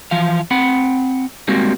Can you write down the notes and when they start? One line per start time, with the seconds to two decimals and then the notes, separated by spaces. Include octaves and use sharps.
0.11 E3 F3 F5
0.51 C4 F#5 B5
1.48 G3 G#3 A#3 C4 F#4